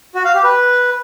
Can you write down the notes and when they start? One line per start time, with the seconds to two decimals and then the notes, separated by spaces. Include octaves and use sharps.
0.15 F#4
0.25 F5
0.34 G4
0.44 B4